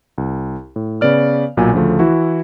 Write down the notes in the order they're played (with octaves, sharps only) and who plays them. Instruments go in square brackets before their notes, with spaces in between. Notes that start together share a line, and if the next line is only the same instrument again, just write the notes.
[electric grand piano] C2
A2
C#3 B3 B4 D5 F6
B1 A#2 F#3 G#5
D2 C#3 F3 A3
E3 E4 F#4